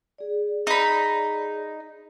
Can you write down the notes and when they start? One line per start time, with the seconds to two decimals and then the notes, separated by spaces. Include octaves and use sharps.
0.18 G#4 D5
0.67 D#4 B5